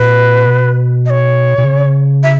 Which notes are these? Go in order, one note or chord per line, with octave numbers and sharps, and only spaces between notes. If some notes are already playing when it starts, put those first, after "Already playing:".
Already playing: A#2 B4
B2
D#5
C#5
B2
C#3
E5